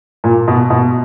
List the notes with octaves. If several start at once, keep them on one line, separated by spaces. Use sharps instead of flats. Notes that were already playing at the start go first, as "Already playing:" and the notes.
A#2
B2
B2